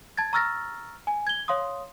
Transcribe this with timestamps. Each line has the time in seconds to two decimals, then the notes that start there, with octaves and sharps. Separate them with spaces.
0.17 A5 G#6 A6
0.33 A#5 C#6 E6 F6 A6 A#6
1.07 G#5
1.27 G#6 G7
1.48 C#5 F5 C6 D#6